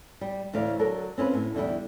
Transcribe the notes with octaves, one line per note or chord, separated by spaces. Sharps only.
G3
D2 A2 E3 D5 F5
D3 F#3 A4 A#4 C#5
C4 C#4 F4 B4
A2
E2 D3 G3 E4